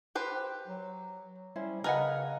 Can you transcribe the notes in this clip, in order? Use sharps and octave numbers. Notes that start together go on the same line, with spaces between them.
G4 B4 C5
F#3
G3 C#4 E4 C5
C#3 G#4 A#4 B4 D#5 F#5 G#5